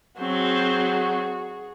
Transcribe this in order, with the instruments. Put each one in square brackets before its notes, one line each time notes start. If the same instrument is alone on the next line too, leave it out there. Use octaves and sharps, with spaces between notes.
[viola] F#3 C4 [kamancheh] F#4 G#4